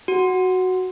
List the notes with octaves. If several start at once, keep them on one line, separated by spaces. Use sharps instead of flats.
F#4